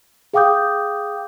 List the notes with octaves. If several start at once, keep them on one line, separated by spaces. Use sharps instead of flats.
G#4 F5 G5 D6 D#6 G6